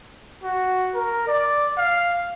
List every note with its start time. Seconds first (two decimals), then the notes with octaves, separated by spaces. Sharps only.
0.44 F#4
0.95 A#4
1.28 D5
1.78 F5